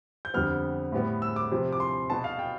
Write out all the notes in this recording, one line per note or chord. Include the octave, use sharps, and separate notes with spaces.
G6
F2 D3 G3 B3 F6
A2 G3 B3
E6
D6
C3 F3 C4
D6
C6
B2 B3 A5
F5
G5